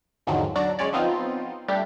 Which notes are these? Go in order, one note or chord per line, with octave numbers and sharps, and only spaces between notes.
E2 G#2 D3 D#3 F3 F#3
F#3 D4 F#4 D5 A#5
G#3 C#4 C#5 D5
F3 B3 C4 D#4 F4
G3 A3 D4 G4